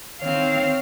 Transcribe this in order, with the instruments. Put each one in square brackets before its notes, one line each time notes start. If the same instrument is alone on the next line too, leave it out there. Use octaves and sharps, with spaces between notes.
[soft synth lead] D#3 [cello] C4 F5 [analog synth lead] C#5